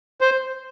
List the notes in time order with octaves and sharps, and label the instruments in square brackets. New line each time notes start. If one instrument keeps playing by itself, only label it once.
[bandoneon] C5